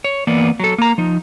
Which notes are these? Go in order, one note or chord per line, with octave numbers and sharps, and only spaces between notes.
C#5
E3 A#3 B3 D5
F#3 A4
A#3 A#5
F3 D#4